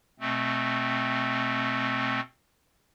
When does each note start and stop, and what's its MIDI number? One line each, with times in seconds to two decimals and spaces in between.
0.20 2.20 47
0.20 2.20 57
0.20 2.20 60